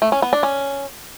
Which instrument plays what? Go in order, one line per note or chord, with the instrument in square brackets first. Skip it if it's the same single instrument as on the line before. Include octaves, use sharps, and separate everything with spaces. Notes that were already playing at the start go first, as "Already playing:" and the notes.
[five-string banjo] A3
C#4
B3
D4
C#4